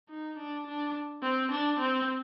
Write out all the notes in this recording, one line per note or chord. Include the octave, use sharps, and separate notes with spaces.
D#4
D4
D4
C4
D4
C4